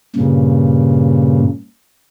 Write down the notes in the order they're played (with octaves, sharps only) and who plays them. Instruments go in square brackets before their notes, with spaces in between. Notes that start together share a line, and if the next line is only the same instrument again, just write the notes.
[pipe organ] G2 A#2 C#3